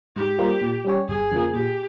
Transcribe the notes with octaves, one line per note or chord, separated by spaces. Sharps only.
G#2 G4
G3 A#3 F4 C5
A#2
G3 C#4 G4 C#5
G1 G#4
F2 C#3 F3 A#3
A#2 G4